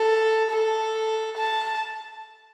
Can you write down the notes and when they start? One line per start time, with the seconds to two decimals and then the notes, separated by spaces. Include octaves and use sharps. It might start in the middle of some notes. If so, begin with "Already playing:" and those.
Already playing: A4
0.51 A4
1.38 A5